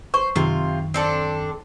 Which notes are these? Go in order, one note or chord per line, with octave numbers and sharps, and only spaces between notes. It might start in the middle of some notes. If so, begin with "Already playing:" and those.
C5 C#6
F#2 C3 D#3 F4
C4 D4 A4